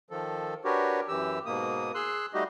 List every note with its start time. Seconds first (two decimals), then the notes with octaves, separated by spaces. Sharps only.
0.10 D#3 F3 A4
0.65 D4 F#4 G4 A#4 B4 C#5
1.08 F#2 E3 G4 E6
1.46 G#2 B2 A#3 D#6
1.95 G#4 C6 E6 F#6
2.34 G3 A3 D#4 F#4 G4 D#5